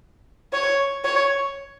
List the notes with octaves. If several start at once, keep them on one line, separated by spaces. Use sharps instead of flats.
C#5
C#5